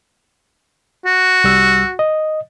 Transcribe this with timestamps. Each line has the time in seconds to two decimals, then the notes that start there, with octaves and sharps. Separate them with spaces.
1.06 F#4
1.44 C2 G3 E6
1.99 D#5